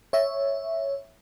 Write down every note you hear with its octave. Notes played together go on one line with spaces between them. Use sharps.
C#5 E5